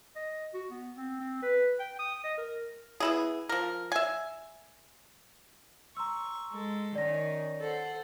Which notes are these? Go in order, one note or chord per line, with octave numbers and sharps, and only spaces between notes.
D#5
F#4
B3
C4
C4
B4
G5
D#6
D#5
A#4
B3 E4 G#4
F3 A#4
E5 G#5
A#5 C6 C#6 E6
G#3 A4
D#3 C#4 D5 A#6
A4 C5 F#5